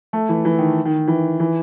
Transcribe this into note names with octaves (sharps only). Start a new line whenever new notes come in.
A3
E3
E3
D#3
D#3
E3
E3